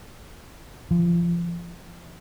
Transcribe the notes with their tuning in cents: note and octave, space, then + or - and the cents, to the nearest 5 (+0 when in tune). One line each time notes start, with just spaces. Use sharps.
F3 -25